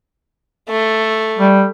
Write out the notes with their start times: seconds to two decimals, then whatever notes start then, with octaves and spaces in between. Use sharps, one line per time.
0.69 A3
1.38 G3